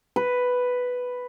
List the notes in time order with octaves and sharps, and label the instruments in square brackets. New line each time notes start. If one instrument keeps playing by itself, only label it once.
[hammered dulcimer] B4